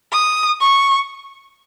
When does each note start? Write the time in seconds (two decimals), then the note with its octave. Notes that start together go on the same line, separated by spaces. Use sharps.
0.12 D#6
0.61 C#6